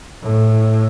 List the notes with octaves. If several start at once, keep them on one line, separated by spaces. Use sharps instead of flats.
A2